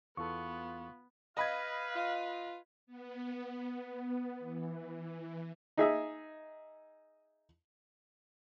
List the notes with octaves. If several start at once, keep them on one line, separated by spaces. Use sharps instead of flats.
E2 B3 F4 A4 C#6
B4 D#5 F5 B5 G#6
F4
B3
E3
D#4 G#4 E5